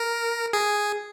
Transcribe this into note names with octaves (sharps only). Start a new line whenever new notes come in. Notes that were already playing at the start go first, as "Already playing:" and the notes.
Already playing: A#4
G#4